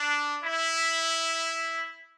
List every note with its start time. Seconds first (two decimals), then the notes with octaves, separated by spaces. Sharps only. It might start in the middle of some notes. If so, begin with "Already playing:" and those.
Already playing: D4
0.42 E4